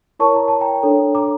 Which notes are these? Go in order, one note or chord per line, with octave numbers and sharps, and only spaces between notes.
E4 A#4 C#5 A5 C#6
A#5
A5
G5 A#5
D4 A4 C#5
A#5 D6